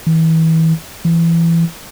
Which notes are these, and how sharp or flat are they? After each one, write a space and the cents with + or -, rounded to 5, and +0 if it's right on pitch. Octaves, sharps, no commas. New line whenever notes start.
E3 -35
E3 +20